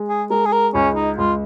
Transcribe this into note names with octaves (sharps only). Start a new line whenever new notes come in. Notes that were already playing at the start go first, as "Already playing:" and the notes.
Already playing: G#3
G#4
G#3 A#4
G#4
A#4
C#2 C#4
D#4
C#2 F4